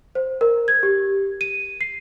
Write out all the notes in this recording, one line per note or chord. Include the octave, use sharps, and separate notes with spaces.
C5
A#4
G#6
G4
D#7
C7